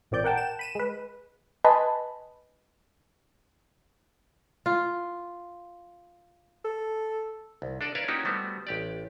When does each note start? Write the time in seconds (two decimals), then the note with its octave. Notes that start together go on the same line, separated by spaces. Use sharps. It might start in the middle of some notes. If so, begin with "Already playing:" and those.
0.11 A1 A#2 C4 D5 G6
0.24 A#4 F#5 G5 A5
0.38 E7
0.59 B5 D#7 E7
0.75 G#3 B4
1.64 B4 D#5 G#5 A5 B5 C6
4.66 F4
6.65 A4
7.62 C2
7.81 D4 A4 D5 D#5
7.95 A#4 B4 C#5 D5 E5 F5
8.08 A#3 C#4 D#4 E4 F#4 G4
8.25 G3 A3 B3 C4 F#4
8.67 A1 G4 D5